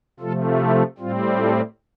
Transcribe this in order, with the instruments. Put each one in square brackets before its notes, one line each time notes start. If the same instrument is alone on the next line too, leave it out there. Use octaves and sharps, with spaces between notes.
[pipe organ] C3 F3 A3 F4 A4
E4 G4
A2 G3 C4 F4
F4 A4